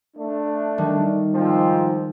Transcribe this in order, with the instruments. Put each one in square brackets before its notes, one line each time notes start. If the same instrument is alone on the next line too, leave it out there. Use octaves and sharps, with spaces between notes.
[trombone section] A3 D4
[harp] D#3 G3
[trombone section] G#2 F3 C4